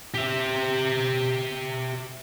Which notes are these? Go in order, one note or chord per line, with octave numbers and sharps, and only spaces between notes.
G4 E5